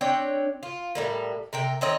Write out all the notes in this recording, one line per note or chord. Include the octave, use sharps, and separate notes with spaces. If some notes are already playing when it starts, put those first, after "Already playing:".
C4 D4 C#5 G5
F4
A2 G3 A#3
C3 A#4 G5
D#3 C4 C#5 D#5